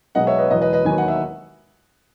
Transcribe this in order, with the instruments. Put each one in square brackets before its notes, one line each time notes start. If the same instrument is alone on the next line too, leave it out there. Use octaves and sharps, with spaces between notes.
[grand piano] B1 B2 G#3 D#5 F#5
C#5 E5
B4 D#5
E1 E2 B2 F#3 B4 D#5
B4 D#5
B4 D#5
D#2 D#3 F#3 G#5
F#5
E5